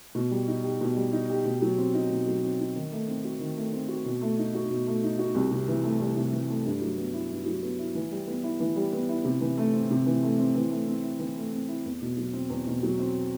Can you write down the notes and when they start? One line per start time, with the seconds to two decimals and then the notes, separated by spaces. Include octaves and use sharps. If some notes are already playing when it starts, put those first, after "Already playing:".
0.15 B2
0.31 G3
0.47 D#4
0.64 G4
0.81 B2
0.96 G3
1.12 D#4
1.29 G4
1.45 B2
1.62 F#3
1.78 C4
1.94 D#4
2.10 B2
2.27 F#3
2.43 C4
2.59 D#4
2.75 D#3
2.92 A3
3.07 C4
3.25 F#4
3.40 D#3
3.57 A3
3.73 C4
3.88 F#4
4.05 B2
4.21 A3
4.38 D#4
4.54 F#4
4.70 B2
4.87 A3
5.03 D#4
5.19 F#4
5.35 C2
5.51 C3
5.68 E3
5.84 A3
6.00 C2
6.16 C3
6.33 E3
6.49 A3
6.66 G2
6.82 F#3
6.98 B3
7.14 E4
7.30 G2
7.46 F#3
7.63 B3
7.79 E4
7.95 E3
8.11 G3
8.28 B3
8.44 E4
8.60 E3
8.76 G3
8.93 B3
9.09 E4
9.24 C3
9.41 E3
9.58 A3
9.73 C4
9.90 C3
10.06 E3
10.23 A3
10.38 C4
10.55 E3
10.71 A3
10.88 C4
11.03 E4
11.19 E3
11.37 A3
11.52 C4
11.68 E4
11.86 E2
12.02 B2
12.17 F#3
12.33 C4
12.50 E2
12.67 B2
12.83 F#3
12.99 C4